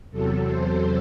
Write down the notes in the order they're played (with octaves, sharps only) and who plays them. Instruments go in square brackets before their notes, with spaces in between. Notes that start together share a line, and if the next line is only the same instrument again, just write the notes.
[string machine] E2 C3 F#3 A4
C5